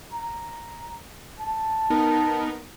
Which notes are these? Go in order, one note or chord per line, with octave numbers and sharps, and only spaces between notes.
A#5
A5
B3 D#4 A#4